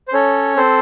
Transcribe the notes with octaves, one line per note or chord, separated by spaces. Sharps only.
C5
C#4 A4 C#5
C4 A4 C5